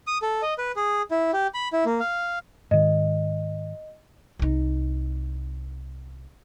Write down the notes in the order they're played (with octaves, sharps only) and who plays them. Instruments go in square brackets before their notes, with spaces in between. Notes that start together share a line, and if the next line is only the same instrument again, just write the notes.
[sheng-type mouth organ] D#6
A4
D#5
B4
G#4
E4
G4
B5
E4
A#3
F5
[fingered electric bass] G#2 D#3 [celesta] D#5
[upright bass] C2 D#4